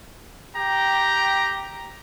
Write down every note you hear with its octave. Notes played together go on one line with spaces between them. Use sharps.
G4 G5 A#5